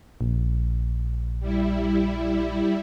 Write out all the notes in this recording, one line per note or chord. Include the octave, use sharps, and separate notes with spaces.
A#1
G3 E4